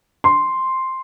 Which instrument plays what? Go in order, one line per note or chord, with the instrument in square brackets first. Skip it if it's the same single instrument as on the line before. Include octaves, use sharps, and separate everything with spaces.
[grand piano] C6